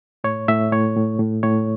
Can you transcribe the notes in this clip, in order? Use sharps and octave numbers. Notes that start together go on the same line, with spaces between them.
A2 C#5
A2 E5
A2 C#5
A2
A2
A2 C#5